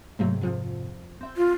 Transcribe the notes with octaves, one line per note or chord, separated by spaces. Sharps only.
G#2 C3 F#3 A3 A#3
F2 F3
C4 E5 G5
F4